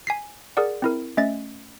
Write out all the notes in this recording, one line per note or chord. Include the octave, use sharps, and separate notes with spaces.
G#5 B6 C7
G#4 A#4 D5 F#5
C4 E4 A#4
A3 C#4 D#5 E5 A6